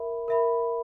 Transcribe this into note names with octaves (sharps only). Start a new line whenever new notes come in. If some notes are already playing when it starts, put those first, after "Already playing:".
Already playing: A#4 E5 B5
A#4 E5 B5